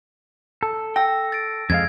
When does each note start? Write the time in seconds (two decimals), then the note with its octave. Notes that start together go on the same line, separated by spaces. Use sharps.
0.63 A4
0.96 G5 E6 A#6
1.32 A6 D7
1.70 F2 G#3 F5 G#6